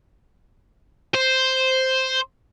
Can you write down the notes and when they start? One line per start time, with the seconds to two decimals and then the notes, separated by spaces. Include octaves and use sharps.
1.14 C5